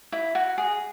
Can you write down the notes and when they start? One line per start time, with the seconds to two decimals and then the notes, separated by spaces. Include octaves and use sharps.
0.12 E4
0.35 F#4
0.58 G#4